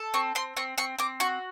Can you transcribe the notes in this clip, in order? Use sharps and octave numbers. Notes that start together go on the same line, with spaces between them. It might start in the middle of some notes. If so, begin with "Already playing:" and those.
Already playing: A4
C4 C#6
C4 C6
C4 C#6
C4 C#6
C4 D6
F#4 C#6